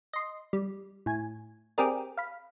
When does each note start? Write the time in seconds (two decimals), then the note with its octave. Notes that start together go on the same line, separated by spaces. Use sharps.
0.13 D#5 C6
0.53 G3
1.06 A2 G#5
1.78 C4 G4 G#4 A#4 D5
2.17 F5 B5